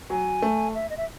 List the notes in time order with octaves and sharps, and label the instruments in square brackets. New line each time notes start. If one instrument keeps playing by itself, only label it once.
[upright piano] F#3 [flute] G#5
[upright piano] A3
[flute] E5
D#5
E5